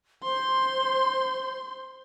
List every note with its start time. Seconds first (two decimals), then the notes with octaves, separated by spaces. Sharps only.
0.24 C5 C6